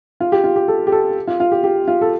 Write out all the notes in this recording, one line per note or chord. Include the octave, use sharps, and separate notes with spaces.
F4
G4
F4
G4
A4
G4
A4
F4
F4
G4
G4
F4
A4